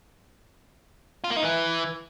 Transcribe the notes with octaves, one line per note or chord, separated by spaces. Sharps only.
F4
A#3
D#4
E3